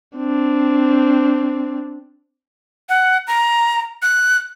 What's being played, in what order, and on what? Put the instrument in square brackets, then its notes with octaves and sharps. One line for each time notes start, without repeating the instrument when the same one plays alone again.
[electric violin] C4 D4
[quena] F#5
A#5
F#6